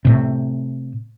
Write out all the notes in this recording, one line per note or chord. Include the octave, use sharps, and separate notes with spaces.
A2 C3